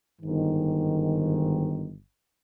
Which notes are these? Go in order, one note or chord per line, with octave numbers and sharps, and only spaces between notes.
G1 G#2 D#3